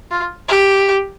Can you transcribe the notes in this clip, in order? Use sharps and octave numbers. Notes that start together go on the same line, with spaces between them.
F4
G4